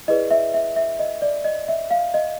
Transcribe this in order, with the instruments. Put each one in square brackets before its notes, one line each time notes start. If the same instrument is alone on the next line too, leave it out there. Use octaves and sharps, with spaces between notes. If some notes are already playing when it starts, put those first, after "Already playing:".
[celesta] E4 G#4 B4 D5 D#5
E5
E5
E5
D#5
D5
D#5
E5
F5
D#5